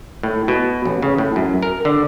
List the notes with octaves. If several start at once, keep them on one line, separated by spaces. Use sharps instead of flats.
A2
B2
A1
C#3
A2
F#2
A#4
D3